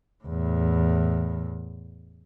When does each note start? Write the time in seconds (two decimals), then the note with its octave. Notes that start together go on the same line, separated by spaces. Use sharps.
0.24 E2 A2